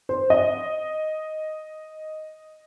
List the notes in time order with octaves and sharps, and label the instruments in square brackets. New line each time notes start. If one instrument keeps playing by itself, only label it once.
[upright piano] C5
D#5